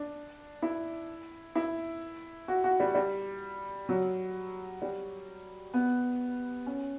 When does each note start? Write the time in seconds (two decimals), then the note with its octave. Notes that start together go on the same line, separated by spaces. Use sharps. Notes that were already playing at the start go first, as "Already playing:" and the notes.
Already playing: D4
0.62 E4
1.55 E4
2.48 F#4
2.64 F#4
2.80 G3
2.95 G3
3.89 F#3
4.82 G3
5.74 B3
6.66 C#4